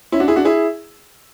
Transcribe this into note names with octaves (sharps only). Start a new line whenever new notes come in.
C#4 E4
D4 F#4
E4 G#4
D4 F#4
E4 G#4